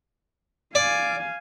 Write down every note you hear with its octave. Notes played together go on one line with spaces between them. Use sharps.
D5 F5 G#5